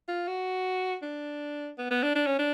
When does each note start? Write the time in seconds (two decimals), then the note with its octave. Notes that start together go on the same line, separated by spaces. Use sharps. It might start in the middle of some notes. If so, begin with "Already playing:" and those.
0.08 F4
0.28 F#4
1.02 D4
1.78 B3
1.91 B3
2.03 D4
2.15 D4
2.26 C#4
2.39 D4